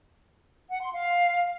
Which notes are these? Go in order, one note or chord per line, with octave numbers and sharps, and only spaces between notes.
F#5
C6
F5